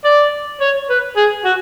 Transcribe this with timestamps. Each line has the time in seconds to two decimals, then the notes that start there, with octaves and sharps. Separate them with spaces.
0.04 D5
0.60 C#5
0.89 B4
1.16 G#4
1.45 F#4